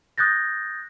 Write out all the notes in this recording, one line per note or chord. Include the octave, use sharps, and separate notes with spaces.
D#6 F#6 G6 A6 A#6